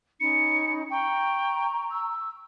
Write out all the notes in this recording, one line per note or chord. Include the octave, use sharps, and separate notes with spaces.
C#4 D#4 B5 C#7
G5 A#5 C#6
E6